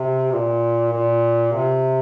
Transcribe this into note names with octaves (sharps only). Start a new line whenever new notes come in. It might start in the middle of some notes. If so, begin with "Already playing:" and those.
Already playing: C3
A#2
A#2
C3